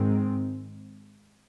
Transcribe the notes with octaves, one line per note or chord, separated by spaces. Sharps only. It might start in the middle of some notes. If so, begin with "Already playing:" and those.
Already playing: G#2 D#3 G#3 C4